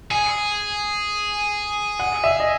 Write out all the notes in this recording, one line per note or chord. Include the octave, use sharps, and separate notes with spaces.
G#4 G#5
F#5
E5
D#5